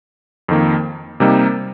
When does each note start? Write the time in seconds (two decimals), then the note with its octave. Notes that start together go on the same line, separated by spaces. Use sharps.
0.48 F2 D#3 A#3
1.20 C3 G3 A#3 D#4